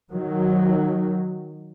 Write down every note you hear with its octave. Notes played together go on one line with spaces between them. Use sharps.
D#3 F#3